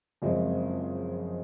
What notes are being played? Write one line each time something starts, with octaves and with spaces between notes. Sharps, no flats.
F#1 F2 C#3 G#3 C4